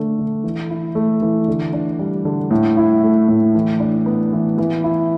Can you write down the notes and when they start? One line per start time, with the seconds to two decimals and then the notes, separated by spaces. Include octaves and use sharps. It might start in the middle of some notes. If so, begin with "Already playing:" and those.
Already playing: D3 A3 D4
0.19 D3
0.44 E3
0.70 E4
0.95 A3
1.22 E3
1.48 D3
1.73 D4
1.99 G3
2.25 D3
2.51 A2
2.77 E4
3.03 A3
3.29 A2
3.55 E3
3.80 D4
4.06 B3
4.33 E3
4.58 E3
4.84 E4